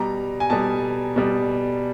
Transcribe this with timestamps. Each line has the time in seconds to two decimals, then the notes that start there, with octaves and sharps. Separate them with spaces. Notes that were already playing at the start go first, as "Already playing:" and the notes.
Already playing: B2 G3 A#5
0.40 G#5
0.50 B2 G3 A5
1.16 B2 G3